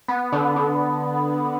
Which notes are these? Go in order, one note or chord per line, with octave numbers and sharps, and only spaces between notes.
B3
D3
D3